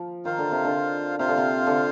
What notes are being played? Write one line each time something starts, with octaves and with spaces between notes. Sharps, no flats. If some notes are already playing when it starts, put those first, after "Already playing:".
Already playing: F3
D#3 F4 C5 F5
D3
C3
D3
C3 F4 C5 F5
D3
C3
D3